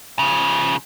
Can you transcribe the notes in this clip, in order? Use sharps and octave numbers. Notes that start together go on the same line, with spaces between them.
C#3 F3